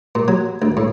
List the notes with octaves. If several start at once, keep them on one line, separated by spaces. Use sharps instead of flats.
A#2
F#3
D2
A2